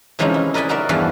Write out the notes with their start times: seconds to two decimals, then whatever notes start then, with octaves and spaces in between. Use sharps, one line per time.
0.19 C3 E3 F3 G#3 C#4 D#4
0.34 E4
0.54 A#4 B4 D5 D#5 G#5 B5
0.69 D#4 F#4 A#4 D5 E5
0.89 E2 G2 E3 F3 A5 B5